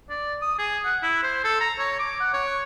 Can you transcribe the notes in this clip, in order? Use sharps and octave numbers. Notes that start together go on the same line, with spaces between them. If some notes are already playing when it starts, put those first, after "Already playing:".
D5
D#6
G#4
F#5
E4
C5
A4
A#5
C#5
D6
F#5
C#5